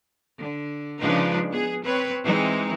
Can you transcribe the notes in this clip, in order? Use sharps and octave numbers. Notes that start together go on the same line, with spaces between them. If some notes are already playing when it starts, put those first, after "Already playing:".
D3
C#3 F3 G#3 D4 D#4 B4
B3 G#4
C4 B4 C#5
E3 G#3 C4 D#4